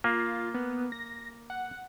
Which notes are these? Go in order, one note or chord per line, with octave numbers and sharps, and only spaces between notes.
A#3 F4
B3
A#6
F#5